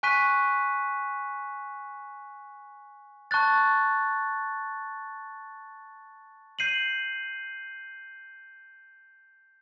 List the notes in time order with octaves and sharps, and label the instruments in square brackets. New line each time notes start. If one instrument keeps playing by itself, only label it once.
[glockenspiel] G#5 C#6 F#6 B6 D#7
A5 C#6 F#6 A6
G6 C7 D#7 F#7